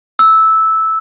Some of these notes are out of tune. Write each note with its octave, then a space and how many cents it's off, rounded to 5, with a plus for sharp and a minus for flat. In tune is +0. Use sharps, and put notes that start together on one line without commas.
E6 -10